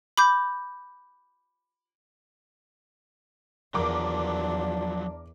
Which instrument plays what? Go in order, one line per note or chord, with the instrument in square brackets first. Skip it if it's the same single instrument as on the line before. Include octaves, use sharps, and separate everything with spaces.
[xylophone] B5 D6 G6
[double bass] E2 [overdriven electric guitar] F3 F#3 [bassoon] D4 [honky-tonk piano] A#4 D6